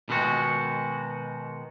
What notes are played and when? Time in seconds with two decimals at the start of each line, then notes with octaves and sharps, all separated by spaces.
0.09 B2 D#3 G#3 F#4